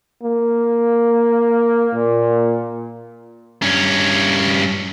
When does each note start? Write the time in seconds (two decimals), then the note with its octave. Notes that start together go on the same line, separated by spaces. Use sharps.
0.23 A#3
1.94 A#2
3.62 G2 C#4